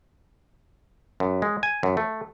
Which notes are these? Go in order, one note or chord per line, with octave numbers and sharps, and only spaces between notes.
F#2
G#3
G#5
F#2
A3